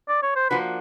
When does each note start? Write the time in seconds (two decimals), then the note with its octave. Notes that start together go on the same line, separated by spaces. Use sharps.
0.09 D5
0.23 C#5
0.36 C5
0.50 F3 A#3 D4 F#4 B4